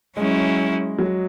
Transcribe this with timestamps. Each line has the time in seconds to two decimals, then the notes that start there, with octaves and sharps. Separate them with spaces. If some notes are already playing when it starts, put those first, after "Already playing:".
0.17 F#3 G#3 C#4 E4
0.99 F#3